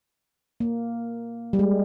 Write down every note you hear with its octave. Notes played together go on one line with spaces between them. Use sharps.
A#3
G3
G#3